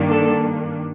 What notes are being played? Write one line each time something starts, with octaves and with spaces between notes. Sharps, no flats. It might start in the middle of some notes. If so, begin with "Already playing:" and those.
Already playing: G2 D#3 A#3 D4
A4